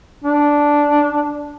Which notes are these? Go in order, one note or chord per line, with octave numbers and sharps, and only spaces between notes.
D4